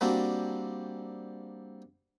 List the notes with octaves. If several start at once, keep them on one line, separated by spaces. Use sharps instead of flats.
G3 A#3 C4 D4 F#4